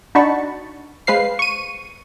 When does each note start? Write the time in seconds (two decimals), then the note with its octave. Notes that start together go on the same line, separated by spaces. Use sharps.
0.15 D4 D#4 F#4 A5 B5 C#6
1.07 G#3 B4 C5 F5 C7
1.39 C#6 D#7